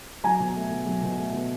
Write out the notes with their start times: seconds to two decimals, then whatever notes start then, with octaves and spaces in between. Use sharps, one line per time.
0.24 F#3 G#5 A#5
0.40 B2
0.56 A3
0.71 B2
0.86 F#3
1.03 B2
1.19 A3
1.33 B2